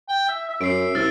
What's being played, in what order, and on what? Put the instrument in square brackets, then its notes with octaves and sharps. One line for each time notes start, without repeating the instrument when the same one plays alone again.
[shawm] G5
E5
E5
[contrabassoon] F#2 [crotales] C7 D7
[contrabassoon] C2 [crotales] E6 F6 A6